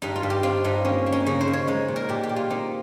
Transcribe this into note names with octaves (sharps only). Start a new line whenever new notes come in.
G2 D#4
F4
G2
G4
C4 F4
G2 D#4
A#3 C#4
A#3
C#4
C#3 D#4
C5
C#3
C#5
G#3 D#4
A#2
A#4
A#2 G4
G4
A#2
F4
C4 D#4